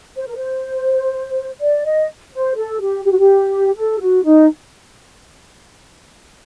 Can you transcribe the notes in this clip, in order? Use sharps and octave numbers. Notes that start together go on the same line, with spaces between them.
C5
A#4
C5
D5
D#5
C5
A4
G4
G4
F#4
G4
A4
F#4
D#4